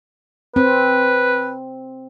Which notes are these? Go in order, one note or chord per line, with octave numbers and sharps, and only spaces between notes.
C4 B4